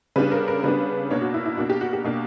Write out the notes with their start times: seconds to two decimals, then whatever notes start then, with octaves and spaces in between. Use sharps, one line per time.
0.16 C#3 G3 B3 D4 B4
0.32 A#4
0.48 A#4
0.63 C#3 G3 B3 D4 B4
1.10 B2 A#3 D4 C#5
1.22 F#4
1.34 E4
1.46 E4
1.57 B2 A#3 D4 F#4
1.70 G4
1.81 F#4
1.93 G4
2.04 B2 A#3 D4